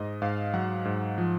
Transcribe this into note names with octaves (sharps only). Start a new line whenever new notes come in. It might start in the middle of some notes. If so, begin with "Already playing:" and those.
Already playing: G#2 D#5
G#2 F5
F#3 F#5
G#2
F3